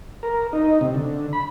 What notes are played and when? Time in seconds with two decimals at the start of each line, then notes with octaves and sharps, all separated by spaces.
0.23 A#4
0.53 D#4
0.81 C3
0.95 D3
1.33 B5